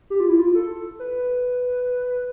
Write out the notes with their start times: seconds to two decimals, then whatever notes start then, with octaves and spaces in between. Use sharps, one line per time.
0.10 G4
0.20 F4
0.29 E4
0.39 F4
0.55 A4
1.00 B4